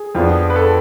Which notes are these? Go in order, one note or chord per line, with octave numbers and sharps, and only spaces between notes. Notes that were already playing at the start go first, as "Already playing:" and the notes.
Already playing: G#4
F2 F3 B3 D4
B4
A4